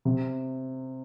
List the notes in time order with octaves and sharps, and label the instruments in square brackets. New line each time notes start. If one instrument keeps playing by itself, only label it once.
[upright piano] C3